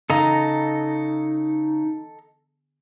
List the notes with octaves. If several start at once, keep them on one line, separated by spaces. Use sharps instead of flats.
C#3 D#4 A4 D#5 A#5